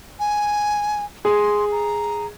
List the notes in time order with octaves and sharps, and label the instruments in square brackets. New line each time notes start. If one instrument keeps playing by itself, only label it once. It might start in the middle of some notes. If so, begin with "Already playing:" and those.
[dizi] G#5
[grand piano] G#4 [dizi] C6
[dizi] A#5